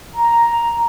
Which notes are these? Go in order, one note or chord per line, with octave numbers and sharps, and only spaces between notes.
A#5